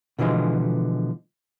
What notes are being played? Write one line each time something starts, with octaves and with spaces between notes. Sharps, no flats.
B2 D3 E3 F3 G#3